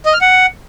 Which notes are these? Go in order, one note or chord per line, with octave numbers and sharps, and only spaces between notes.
D#5
F6
F#5